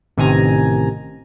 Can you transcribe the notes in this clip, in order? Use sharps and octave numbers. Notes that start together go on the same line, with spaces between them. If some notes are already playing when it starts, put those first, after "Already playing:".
A1 C3 D#3 G#5 A#5